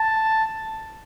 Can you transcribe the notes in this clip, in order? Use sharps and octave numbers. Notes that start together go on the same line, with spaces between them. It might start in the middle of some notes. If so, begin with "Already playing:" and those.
Already playing: A5